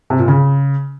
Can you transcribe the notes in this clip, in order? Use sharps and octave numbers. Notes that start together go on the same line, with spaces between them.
C3
A#2
C#3